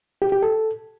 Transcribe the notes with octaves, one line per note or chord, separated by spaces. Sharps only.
G4
G4
A4